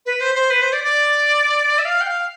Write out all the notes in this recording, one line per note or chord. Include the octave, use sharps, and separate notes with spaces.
B4
C5
C5
B4
C5
D5
D5
E5
F5
G5
F5